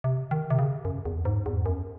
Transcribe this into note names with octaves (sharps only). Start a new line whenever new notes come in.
C3
D#3
C3
C#3
F#2
E2
G#2
E2
F#2